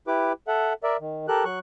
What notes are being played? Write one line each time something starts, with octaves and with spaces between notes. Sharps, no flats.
E4 G4 B4 D6
A4 E5 F#5
A#4 D5 E5
D#3
G4 A4 A#4 F#6
F#3 C#6 F#6